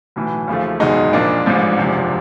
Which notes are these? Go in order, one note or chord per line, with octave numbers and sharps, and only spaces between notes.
B1 A2 E3
D#2 C#3 F3 A3
F#1 E2 B2 G#3 D#4
A#1 A#2 F3 A#3 D4
A1 G#2 F3
F#1 E2 C3 F3